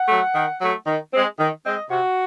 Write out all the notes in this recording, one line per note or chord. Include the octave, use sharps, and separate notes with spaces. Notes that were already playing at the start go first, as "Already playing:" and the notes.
Already playing: F#5
F#3 A3
D#3
F#3 A3
D#3
G#3 C4
D#3
G#3 C4 D#5
C3 F#4